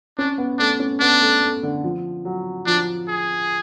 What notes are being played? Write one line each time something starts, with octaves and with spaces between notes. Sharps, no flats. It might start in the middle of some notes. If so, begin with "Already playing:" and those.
C#4 D4
B3
A3 D4
C#4
B3 D4
A3
A3
D3
F3
F#3
F3 D4
G#4